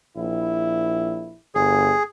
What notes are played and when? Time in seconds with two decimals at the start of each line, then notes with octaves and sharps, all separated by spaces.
0.17 A#1 E4
1.55 G1 G#4